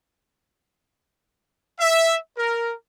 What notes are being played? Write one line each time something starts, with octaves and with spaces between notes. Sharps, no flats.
E5
A#4